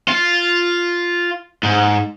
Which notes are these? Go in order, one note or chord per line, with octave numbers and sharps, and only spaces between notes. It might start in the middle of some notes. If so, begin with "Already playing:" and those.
F4
G#2